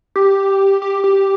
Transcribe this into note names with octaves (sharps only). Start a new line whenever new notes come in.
G4
G4
G4